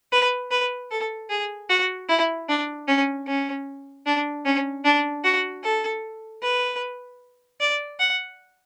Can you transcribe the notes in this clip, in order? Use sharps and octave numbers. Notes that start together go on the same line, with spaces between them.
B4
B4
A4
G#4
F#4
E4
D4
C#4
C#4
D4
C#4
D4
F#4
A4
B4
D5
F#5